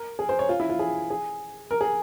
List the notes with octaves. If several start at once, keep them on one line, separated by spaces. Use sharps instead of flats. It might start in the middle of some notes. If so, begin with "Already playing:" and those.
Already playing: A#4
G#4
C5
C#5
F4
E4
F4
G#4
G#4
A#4
G#4